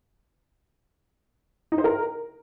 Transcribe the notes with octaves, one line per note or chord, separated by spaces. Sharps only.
D#4
C5
A#4